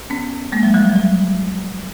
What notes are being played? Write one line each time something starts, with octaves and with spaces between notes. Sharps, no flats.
B3 C#4
G#3 A#3
F#3 G#3
F3 G3
F#3
F#3